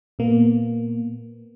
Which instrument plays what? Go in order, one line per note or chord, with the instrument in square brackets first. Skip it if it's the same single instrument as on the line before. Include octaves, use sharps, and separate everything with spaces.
[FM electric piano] A#2 A#3 B3